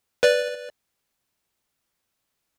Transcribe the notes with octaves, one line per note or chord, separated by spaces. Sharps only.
B4 D5